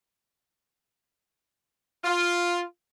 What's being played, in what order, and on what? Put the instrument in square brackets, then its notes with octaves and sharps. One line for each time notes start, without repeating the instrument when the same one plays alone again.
[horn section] F4